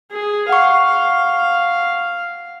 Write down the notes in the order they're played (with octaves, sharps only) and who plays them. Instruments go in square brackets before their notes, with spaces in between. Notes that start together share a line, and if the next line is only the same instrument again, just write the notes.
[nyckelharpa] G#4
[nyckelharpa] F5 [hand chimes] F#5 C#6